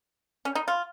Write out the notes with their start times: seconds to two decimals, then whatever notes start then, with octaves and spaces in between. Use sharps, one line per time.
0.45 C#4
0.55 D#4
0.68 F4